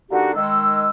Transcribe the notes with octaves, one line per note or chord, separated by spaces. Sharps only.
D3 A#3 D4 D#4 F#4 G4
D#3 G#3 E6